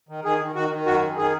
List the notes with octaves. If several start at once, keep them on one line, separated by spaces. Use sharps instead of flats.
D#3
D#3 G#4
D#3
D#3 F#4
D#3
F#2 F#4
F#2
D#3 G#4